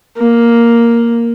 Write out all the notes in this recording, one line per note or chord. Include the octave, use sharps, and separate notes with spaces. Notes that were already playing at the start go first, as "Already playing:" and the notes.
A#3